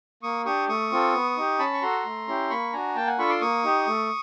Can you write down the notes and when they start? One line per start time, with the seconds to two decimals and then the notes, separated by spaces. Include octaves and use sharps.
0.23 A#3 C#6 D#6
0.46 D4 G4 C#6 D#6
0.68 A3 C#6 D#6
0.92 C4 F4 A4
1.14 B3
1.37 D#4 G4
1.59 C#4 A5 B5
1.73 C#6
1.82 F#4 A4 A#5 C6
2.05 A3
2.28 C#4 E4 G4
2.50 A#3 B5 C#6
2.73 D4 F#4 G#5 A#5
2.95 A#3 G5 A5
3.07 F#5 G#5
3.19 D4 F4 A4 B5 C#6
3.29 C6 D6
3.41 A#3 C#6 D#6
3.64 D#4 G4
3.87 A3